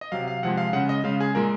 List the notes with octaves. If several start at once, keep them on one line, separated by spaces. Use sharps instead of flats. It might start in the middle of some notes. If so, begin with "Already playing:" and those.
D#5
C3 F#3 F5
F5
C3 F3 G#3 F#5
F5
C#3 G#3 F#5
D#5
C#3 G#3 F5
G#4
A#2 G#3 A#4